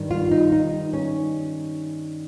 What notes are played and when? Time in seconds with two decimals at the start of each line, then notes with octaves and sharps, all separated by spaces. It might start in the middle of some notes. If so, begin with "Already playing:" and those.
Already playing: G2 D#3 G3
0.11 F4
0.31 D#4
0.52 D#4
0.93 C#4